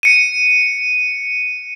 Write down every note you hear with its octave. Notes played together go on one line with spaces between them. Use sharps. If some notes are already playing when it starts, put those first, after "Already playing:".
C#7 D#7